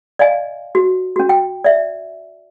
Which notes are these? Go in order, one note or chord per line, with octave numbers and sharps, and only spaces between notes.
D5 D#5 F5 G#5
F#4
C#4 F#4
G5
D5 E5